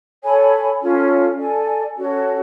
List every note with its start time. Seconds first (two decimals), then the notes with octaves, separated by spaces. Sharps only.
0.24 A4 C#5 G#5 B5
0.82 C#4 F4 A4
1.38 A4 D5 G#5
1.96 C#4 F#4 A4 C#5